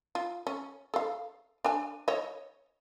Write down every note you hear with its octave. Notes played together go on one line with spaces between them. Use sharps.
F4
C#4
A4 F5
D4 G#5
C#5 D#5